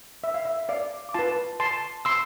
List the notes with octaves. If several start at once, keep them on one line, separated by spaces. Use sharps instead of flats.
E5
F5
E5
D5 F5
D6
F4 B4 A5 C6
A5 C6
C6 E6